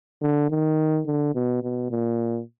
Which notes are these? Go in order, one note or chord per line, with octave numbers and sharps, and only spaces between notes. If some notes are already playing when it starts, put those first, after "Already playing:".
D3
D#3
D3
B2
B2
A#2